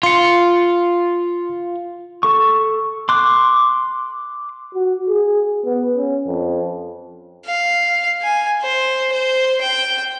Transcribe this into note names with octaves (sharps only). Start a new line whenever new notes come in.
F4 C6 C#7
A4 C#6
C6 D6 F#6
F#4
G#4
B3
C#4
F2
F5
G#5
C5
C5
G5